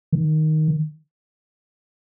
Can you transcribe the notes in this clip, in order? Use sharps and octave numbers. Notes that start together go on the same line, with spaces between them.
D#3